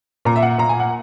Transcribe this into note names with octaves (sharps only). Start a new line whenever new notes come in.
A#2 A#5
E5
F#5
A#2 A#5
G#5
F#5